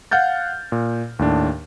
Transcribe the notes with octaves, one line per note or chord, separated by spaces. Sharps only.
F5 F#5 F6 G6 A6
A#2
D#2 A2 D4